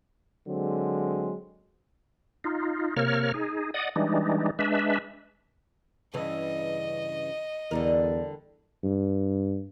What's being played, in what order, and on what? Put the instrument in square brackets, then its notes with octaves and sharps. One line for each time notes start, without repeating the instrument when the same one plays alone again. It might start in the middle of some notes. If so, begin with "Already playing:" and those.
[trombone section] D3 F#3 G#3 C4
[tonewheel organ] D#4 F4
C3 A#3 A#4 C#5 F6
D#4 G#4
D5 D#5 F#5 D#6
E3 G3 G#3 D4 D#4
G#3 D4 B4 E5
[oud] G2 C#3 E3 [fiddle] D#5
[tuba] E2 [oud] D3 G3 A#4
[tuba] G2